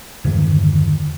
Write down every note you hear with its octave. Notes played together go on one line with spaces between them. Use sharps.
E2 G2 D3 D#3